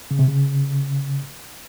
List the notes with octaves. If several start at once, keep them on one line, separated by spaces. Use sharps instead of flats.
C#3
C3
C#3